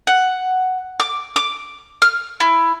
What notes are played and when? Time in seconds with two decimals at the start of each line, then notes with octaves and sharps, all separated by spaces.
0.07 F#5
1.00 D6
1.36 D6
2.02 F6
2.40 E4